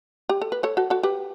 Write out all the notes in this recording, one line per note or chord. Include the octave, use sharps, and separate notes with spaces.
G4
A4
B4
A4 C#5
F#4 A4
F#4 A4
G4 B4